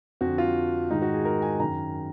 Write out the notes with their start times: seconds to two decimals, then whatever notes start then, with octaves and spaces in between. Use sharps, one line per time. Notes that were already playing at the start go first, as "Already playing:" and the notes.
0.21 F2 D3 F#4
0.38 F4
0.90 G#2 D#3 D#4
1.02 F#4
1.14 G#4
1.25 A#4
1.42 G#5
1.60 F#2 D#3 A#5